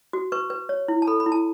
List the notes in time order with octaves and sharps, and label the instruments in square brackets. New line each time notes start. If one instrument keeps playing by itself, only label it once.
[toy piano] F#4
B4 C#6
B4
C#5
E4
A5
A4 B5
B5
E4
A5